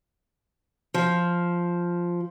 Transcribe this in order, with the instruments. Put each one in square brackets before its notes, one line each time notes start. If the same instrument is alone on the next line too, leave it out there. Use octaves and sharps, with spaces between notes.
[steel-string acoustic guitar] F3